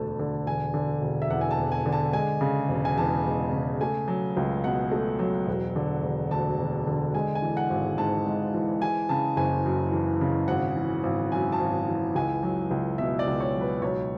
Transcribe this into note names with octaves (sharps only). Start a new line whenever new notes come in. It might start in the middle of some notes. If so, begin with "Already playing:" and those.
Already playing: E1 D2 D3 A3 A5
D3
E1 G#5
D3
E1
E5
E2 F#5
G#5
A5
E1
G#5
D3
A5
G#3 G#5
C#3
E1
G#5
E2 A5
G#3
C#3
A3 G#5
F#3
C#2
B2 F#5
A3
F#3
E1
D3
E1
D2 A5
E1
D3
G#3 G#5
G#5
E3
F#5
G#1
G#2 A5
G#3
E3
E3 G#5
C#3 A5
F#1 G#5
F#2
E3
C#3
G#1 F#5
E3
G#1
F#2 G#5
A5
G#1
E3
C#2 G#5
F#3
C#2
B2 E5
D5
C#2
C#5
F#3
B4
B1 C#5